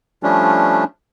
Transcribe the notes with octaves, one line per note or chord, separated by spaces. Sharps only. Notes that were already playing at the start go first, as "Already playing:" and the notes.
F3 G3 A3 C#4 D4